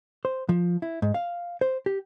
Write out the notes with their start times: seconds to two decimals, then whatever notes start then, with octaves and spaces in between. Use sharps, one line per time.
0.25 C5
0.49 F3
0.82 E4
1.02 G#2
1.14 F5
1.61 C5
1.86 G4